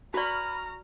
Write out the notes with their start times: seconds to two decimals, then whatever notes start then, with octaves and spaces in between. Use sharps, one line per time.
0.14 F#4 B4 D5 A#5 B5 C#6 F6